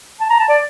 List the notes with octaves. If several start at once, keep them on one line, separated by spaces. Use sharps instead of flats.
A5
A#5
A5
D5